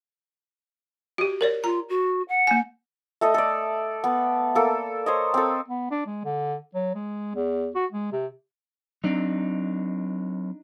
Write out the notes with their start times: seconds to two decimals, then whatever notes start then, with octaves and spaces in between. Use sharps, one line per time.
1.18 F#4 G4
1.41 A#4 C#5 D5
1.64 F4 A#5
1.89 F#4
2.29 F#5
2.47 A#3 G#5
3.21 A3 A4 D#5
3.34 A4 D5
4.04 B3
4.55 A#3 A4
5.06 C5 C#5 D#5
5.34 C4 A4
5.68 B3
5.91 D4
6.06 G#3
6.25 D3
6.75 F#3
6.95 G#3
7.35 E2
7.75 F#4
7.92 G#3
8.12 C3
9.04 F#3 C4 D4 D#4